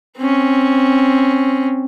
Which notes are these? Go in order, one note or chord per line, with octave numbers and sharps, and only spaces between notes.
C4 C#4